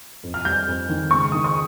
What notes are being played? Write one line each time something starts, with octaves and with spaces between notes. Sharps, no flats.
F2
F6
G3 G6
F2
D#3
C#2 C#6
D#3 D#6
C#6